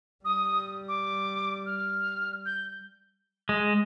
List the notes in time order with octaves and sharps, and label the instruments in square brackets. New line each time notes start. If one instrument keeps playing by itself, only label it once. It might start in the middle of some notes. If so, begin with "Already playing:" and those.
[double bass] G3 [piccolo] D#6
[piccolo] D6
F6
G6
[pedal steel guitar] G#3